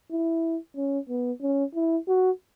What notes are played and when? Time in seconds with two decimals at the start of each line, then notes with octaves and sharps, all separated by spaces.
0.11 E4
0.76 C#4
1.09 B3
1.42 C#4
1.75 E4
2.08 F#4